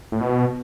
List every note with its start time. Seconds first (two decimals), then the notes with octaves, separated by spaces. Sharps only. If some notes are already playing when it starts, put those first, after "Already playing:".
0.12 A2
0.21 B2